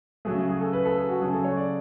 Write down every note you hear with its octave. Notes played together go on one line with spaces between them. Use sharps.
C#3 F#3 A3 G#4
G#4
A4
B4
A4
G#4
F#4
C#3 F#3 A3 G#4
A4
C#5
D5